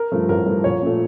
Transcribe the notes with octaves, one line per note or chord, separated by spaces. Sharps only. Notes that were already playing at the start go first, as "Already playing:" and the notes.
Already playing: A#4
G2 F3 A3
A1 A#4
G2 F3 A3
A#1 C#5
A#2 F3 A3